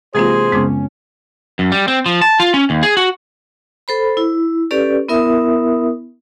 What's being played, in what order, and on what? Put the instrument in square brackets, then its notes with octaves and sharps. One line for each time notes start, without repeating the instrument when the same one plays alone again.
[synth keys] C3 E3 A#3 [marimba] G#3 C4 F4 [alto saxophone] G#4 [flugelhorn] C5
[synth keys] F#2 C#4 [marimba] C#3 G#3 B3
[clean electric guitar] F#2
G3
C4
F3
A5
F4
C#4
D#2
G#4
F#4
[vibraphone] A4 C5 B5
E4
C#4 G4 A4 B4 D5
B3 E4 A#4 E5 D#6